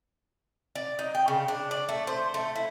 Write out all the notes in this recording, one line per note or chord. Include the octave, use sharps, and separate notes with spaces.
D5
D#4
G5
C#3
D4
D5
A3
C5
A3
E4